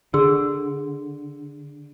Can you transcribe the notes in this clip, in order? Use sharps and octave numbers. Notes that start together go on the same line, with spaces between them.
D3 G#4 C6 E6